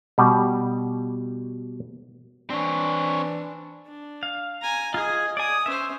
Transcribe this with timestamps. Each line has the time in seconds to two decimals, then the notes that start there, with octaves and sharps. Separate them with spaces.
0.18 B2 G3
2.50 E3 C4 D4 C#5
3.86 D4
4.23 F5
4.62 G#5 A#5
4.94 F4 G#4 D#5 G#5
5.37 D5 G#5 D#6
5.66 C#4 C5 E5